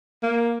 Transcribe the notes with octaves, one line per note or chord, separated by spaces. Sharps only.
A#3